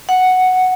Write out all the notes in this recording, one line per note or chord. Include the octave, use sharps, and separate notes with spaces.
F#5